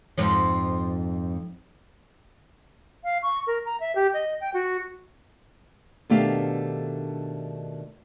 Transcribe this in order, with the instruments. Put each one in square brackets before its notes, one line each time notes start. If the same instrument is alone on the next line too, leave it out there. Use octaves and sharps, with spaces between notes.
[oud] F2 G#2 F3
[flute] F5
C#6
A#4
A#5
E5
G4
D#5
G5
F#4
[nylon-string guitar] B2 D#3 A3 D4 G4 F5